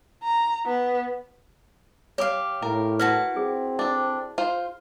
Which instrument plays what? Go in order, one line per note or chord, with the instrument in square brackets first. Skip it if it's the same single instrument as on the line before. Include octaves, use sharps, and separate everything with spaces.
[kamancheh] A#5
B3
[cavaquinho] G4 F5 [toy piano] C#5 D6
[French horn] A2 [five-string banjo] A#4
[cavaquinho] E4 F#4 A5 [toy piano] B4
[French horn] C4 [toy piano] G#4
[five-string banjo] D4 A4
F4 C5